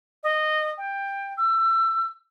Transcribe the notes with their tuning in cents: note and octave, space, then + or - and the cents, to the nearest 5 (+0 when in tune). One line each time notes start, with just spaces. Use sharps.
D#5 -15
G5 +15
E6 +25